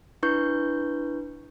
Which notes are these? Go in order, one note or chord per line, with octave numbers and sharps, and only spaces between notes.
D4 E4 B4 C#6 G6